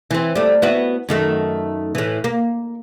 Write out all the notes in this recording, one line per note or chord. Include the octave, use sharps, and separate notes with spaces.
E3 C4
G3 A3
B3 E4 F#4
F#2 D#3 A3
A2 E3
A#3